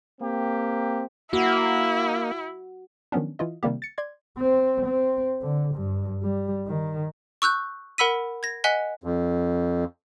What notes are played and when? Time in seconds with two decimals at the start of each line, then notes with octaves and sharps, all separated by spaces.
0.20 A#3 C4 G4
1.33 A#3 E4 F#4
3.12 D#3 F3 F#3 B3 C#4 D4
3.39 E3 E4 F4 D#5
3.63 C3 D#3 G3 A#3 G4
3.82 A6 C#7
3.98 D5 C6 G#6
4.38 C4
4.85 C4
5.42 D3
5.75 G2
6.23 G3
6.68 D#3
7.42 C#6 E6 F#6 G6
7.98 A#4 F#5 B5 E6 B6 D#7
8.43 G#6 A#6
8.64 D#5 F#5 G#5 F#6 B6 G7
9.04 F2